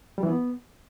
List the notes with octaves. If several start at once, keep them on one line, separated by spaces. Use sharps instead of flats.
G3
E3
B3